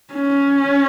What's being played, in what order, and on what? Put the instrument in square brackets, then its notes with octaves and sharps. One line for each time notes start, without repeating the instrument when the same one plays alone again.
[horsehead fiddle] C#4